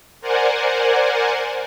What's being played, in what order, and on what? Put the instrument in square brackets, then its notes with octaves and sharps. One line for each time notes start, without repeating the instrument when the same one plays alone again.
[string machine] A#4 C5 D5 F#5 G#5